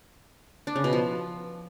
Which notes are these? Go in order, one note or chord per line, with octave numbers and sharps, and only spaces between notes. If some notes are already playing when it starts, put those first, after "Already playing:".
D4
C#3
B2
F3